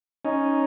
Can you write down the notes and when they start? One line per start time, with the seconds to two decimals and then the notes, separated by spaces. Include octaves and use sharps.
0.25 C#4 D#4